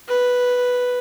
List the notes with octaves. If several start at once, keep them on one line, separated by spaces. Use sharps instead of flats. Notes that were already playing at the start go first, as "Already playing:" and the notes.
B4